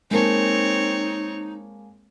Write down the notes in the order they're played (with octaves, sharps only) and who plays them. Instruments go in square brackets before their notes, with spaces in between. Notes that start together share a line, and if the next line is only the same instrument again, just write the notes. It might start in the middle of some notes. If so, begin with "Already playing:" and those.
[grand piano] G#3 A#3 A5 [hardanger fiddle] C4 C#5 [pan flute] D#4